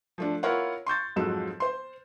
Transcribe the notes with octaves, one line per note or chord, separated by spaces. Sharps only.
F3 A3 D4
E4 F4 A#4 C#5 F5 F#5
C6 C#6 G6 A6
F2 G#2 F3 F#3 A4 E7
C5 C6